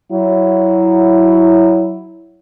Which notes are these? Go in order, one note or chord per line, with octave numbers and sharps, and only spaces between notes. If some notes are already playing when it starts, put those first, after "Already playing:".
F#3 E4